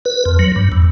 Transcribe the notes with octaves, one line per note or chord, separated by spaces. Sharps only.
B4
F2
F#3
G2
E2